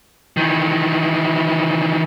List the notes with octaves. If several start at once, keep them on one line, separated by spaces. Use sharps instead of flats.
D#3 E3